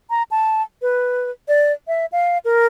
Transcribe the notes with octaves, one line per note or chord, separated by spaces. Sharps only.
A#5
A5
B4
D5
E5
F5
A#4